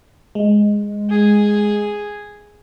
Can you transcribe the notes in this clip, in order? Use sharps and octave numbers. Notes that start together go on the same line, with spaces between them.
G#3
G#4